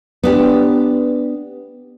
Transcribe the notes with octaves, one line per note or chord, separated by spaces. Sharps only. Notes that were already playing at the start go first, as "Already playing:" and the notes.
B3 D4 G4